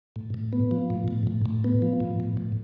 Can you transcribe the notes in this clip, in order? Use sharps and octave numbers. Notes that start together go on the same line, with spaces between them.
A2
A2
B3
F3
A2
A2
A2
A2
B3
F3
A2
A2
A2